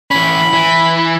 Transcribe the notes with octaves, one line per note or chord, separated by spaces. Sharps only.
E3 C#4 B5
E3